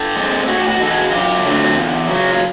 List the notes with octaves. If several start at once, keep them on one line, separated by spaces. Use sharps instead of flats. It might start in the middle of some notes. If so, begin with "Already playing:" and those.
Already playing: G4 A4
G#3 C4
A2 F#4 G#4
G4
F#4
E3 G#3 A4
F#4 G#4
F#2 F4 G4
D3 F#3 A3 C4
E2
C#3 F#3
F4